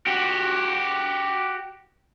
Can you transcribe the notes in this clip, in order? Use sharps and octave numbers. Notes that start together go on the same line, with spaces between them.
F#4 G4